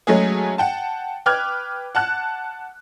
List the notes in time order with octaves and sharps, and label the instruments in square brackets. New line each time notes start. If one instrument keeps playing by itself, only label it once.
[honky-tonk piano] F#3 G#3 A3 C#4 F#4 G#4
F#5 G5 A5
B4 G5 D6 F6 F#6 G#6
F#5 A5 F#6